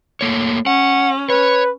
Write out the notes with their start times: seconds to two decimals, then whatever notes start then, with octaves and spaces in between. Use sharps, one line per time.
0.21 A3 A#3 C#5
0.66 C#4 F#5
1.30 B4 C#5